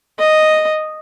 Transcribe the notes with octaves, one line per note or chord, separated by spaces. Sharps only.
D#5